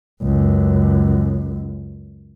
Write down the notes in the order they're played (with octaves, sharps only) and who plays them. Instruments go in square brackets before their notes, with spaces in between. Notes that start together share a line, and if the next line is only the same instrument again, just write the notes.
[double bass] C#2 F#2